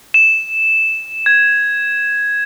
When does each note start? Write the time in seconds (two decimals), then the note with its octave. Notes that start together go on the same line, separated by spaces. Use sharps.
0.14 E7
1.26 G#6